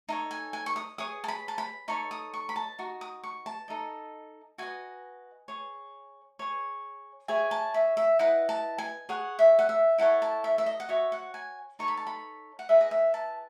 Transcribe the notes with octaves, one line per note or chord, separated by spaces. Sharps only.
D#4 A4 C#5
G#5
G#5
C#6
D#6
G#4 C#5 D#6
A5
B5
A5
B5
D#4 A4 C#5 C#6
D#6
C#6
B5
A5
D#4 F#4
D#6
C#6
A5
D#4 A4 D#5
F#4 B4 D#5 G#5
G#4 C#5
G#4 C#5
E4 G#4 C#5 G#5
A5
E5
E5
E4 B4 D#5 F#5
A5
G#5
G#4 C#5 F#5
E5
F#5
E5
E4 A4 C#5 F#5
A5
E5
E5
D#5
F#5
F#4 C#5 E5
F#5
G#5
D#4 A4 C#5 C#6
B5
A5
B5
F#5
E4 G#4 B4 D#5 E5
D#5
E5
A5